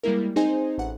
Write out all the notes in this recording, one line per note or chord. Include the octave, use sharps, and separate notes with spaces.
G3 G#3 A#3 E4 A#4
C4 D#4 G#4 C5 D#5 G#5
A1 F#5